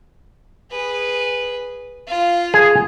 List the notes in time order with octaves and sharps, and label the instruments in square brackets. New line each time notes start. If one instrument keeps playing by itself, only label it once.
[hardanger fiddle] G#4 B4
F4 F5
[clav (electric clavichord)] G#4